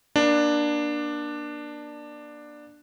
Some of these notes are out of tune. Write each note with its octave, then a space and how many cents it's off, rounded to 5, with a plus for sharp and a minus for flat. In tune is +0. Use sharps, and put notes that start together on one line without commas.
A#3 +40 D4 +10